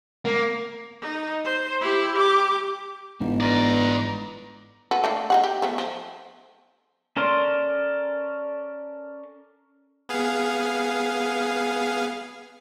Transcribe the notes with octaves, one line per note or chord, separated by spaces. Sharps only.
A#3
D#4
C5
E4 G4
G4 D6
G1 G#2 E3 D#4
B4 D5 A#5
F#4 A4 B4
A3 A#3 D4
D#4 G#4 F#5
G4
F3 A3 B3
F3
C#4 A4 A#4 D5 C6
B3 G#4 F5